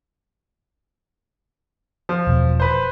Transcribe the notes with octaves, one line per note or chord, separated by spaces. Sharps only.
F3
E1 E2
B4 C5